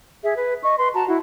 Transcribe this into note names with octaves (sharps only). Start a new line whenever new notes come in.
G#4 E5
B4
D#5 C#6
B4 C6
F#4 A5 A#5
E4 F#4